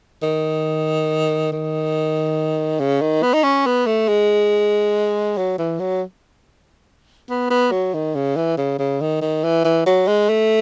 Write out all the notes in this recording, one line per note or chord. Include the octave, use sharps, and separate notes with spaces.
D#3
D#3
C#3
D#3
B3
D#4
C#4
B3
A3
G#3
F#3
E3
F#3
B3
B3
F#3
D#3
C#3
E3
C#3
C#3
D#3
D#3
E3
E3
F#3
G#3
A3